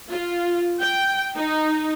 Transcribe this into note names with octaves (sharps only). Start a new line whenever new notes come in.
F4
G5
D#4